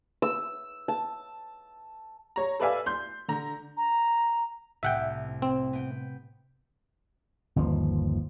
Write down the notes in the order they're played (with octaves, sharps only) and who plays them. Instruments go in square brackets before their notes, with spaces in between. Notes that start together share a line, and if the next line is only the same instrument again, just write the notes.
[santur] E6
A5
[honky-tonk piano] C#5 A#5
A4 B4 D5 E5 F5 G#5
C6 G6
D3 A#5
[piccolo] A#5
[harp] C2 A2 [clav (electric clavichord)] E5 F#5 G5
[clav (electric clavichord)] C4
[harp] B3 G5
[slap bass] G1 D#2 F3